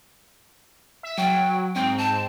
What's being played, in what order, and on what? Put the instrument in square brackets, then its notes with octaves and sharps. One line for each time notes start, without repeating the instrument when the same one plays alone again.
[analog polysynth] E5
[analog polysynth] F#3 [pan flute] G5
[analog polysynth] G#2 C4 [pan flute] G5
[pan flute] A5